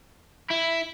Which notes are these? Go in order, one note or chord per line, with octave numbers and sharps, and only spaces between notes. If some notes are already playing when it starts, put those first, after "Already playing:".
E4